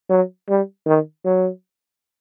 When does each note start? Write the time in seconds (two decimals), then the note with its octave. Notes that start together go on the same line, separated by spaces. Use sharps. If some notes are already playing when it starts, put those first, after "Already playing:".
0.10 F#3
0.49 G3
0.87 D#3
1.25 F#3